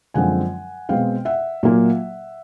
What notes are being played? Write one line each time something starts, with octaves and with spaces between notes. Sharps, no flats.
F#2 D3 F3 G#3 C4 F#5 G#5
B2 G#3 C4 F5 G5
E5 F#5
A#2 F#3 A#3